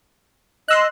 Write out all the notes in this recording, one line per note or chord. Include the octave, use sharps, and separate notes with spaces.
D#5 C6 E6 F#6